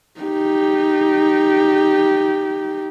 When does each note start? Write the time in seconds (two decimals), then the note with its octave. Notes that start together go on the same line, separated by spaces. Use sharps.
0.21 D#4 G4